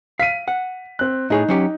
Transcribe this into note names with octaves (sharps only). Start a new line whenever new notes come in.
F5 B6 D#7
F#5
C4 F#6
A2 D#4 G#4 C#5
F#3 C#4 G4